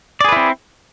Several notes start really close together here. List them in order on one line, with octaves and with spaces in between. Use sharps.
D5 G#4 B4 E4 C4